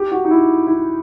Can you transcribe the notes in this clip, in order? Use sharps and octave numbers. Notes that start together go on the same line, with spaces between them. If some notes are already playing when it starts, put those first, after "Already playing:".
Already playing: G4
F#4
D#4
E4
E4